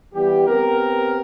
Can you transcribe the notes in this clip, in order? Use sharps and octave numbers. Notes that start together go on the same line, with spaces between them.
E3 G3 B3 G4
B3 C4 G4 A#4